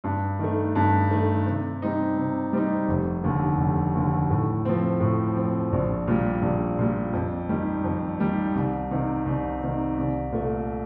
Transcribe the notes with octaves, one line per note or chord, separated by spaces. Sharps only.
G2
D#3 A3
G2
D#3 A3
C3
G3 C4 D#4
C3
G3 C4 D#4
F1
D#2 D3
F1
D#2 D3
A2
F3 C4
A2
F3 C4
A#1
A#2 G3
A#1
A#2 G3
F2
D#3 G3
F2
D#3 G3
C2
C3 D#3
C2
C3 D#3
C2
A#2 A3